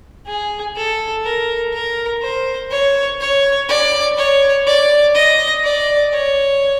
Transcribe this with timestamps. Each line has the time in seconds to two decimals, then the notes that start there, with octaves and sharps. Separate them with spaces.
0.26 G#4
0.76 A4
1.24 A#4
1.73 A#4
2.22 C5
2.71 C#5
3.20 C#5
3.68 D5
4.18 C#5
4.66 D5
5.15 D#5
5.64 D5
6.13 C#5